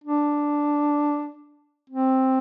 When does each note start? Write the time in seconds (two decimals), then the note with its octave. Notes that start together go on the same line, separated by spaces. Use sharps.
0.04 D4
1.90 C4